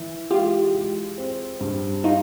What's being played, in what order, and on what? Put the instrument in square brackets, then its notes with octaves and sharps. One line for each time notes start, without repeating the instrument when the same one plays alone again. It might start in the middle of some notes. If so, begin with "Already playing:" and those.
Already playing: [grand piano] E3 E4
[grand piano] G#3 [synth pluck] F4 G4
[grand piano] G#3
C4
G2
[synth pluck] D#4 F4